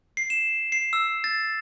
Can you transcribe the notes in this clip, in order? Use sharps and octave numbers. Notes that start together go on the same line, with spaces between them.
C7
E7
C7
E6
A6